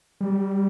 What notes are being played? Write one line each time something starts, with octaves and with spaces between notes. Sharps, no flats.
G3